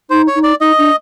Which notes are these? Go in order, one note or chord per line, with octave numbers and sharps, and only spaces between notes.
D#4 C5
C#5
D#4
D5
D#4 D#5
D4